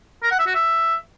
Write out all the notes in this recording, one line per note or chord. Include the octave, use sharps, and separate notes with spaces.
A#4
F#5
E5
F#4
E5